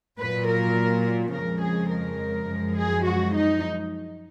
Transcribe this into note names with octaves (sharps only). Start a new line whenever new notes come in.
A#2 F#3 B4
A#4
F2 C#3 F3 G#3 A#4
G#4
A#4
F#2 F3 G#3
G#4
F#4
D#4